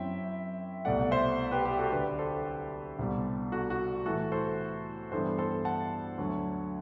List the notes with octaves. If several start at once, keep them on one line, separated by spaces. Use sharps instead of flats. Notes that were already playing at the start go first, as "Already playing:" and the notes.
Already playing: F#2 F#3 C4 E4 E5 G5
C2 B2 A3 D5 F#5
C5 E5
G4 B4
G4
F#4 A4
D2 D3 A3 D4 G4 B4
A4 C5
C2 B2 G3
F#4 A4
F#4
A2 E3 A3 F#4 A4
A4 C5
G2 E3 G3 B3 A4 C5
A4 C5
F#5 A5
D2 D3 F#3